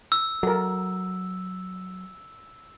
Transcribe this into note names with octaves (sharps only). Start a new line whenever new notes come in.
E6
F#3 A4 A#4